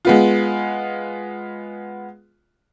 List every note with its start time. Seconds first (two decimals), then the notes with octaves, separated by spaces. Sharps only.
0.05 G#3 B3 F4